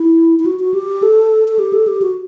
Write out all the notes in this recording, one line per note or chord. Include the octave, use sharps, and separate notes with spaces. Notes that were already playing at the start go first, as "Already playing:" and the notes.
Already playing: E4
E4
F#4
F#4
G4
A4
A4
G4
A4
G4
F#4